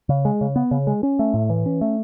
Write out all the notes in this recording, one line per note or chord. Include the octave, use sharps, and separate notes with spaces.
C#3
G#3
C#3
B3
C#3
G#3
C#4
A3
A2
E3
C#4
A3